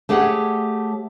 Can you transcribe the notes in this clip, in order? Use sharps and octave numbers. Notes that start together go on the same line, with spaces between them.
A3 G4 G#4 C#5 F#5